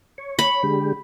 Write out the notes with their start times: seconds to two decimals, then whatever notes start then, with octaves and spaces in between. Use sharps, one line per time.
0.18 C#5
0.39 B5
0.63 D3 G#3 G4